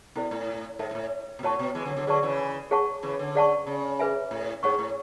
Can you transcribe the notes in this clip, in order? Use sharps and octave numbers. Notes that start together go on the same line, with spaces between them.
B2 C#4 E4 A4 D5
A2
G#2 A4 E5 A5
G#2
A2
B2
A2 F#4 C#5 F#5 A5 C#6
B2
E3 G#3
D3 F#3
D3 F#3
D3 F#3 G#4 B4 D5 A5 C#6
C#3 E3
G#4 C#5 F#5 A5 C#6
C#3 E3
D3
G#4 D5 F#5 A5 C#6
C#3
G#4 B4 E5 G#5
A2
G#2 G#4 C#5 F#5 C#6
A2